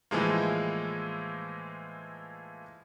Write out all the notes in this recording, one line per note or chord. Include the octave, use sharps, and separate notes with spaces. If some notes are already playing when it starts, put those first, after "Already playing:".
A2 E3 F3 G#3 A#3